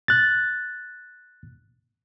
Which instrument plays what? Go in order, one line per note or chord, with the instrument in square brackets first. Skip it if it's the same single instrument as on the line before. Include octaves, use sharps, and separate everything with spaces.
[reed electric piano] F#6 A6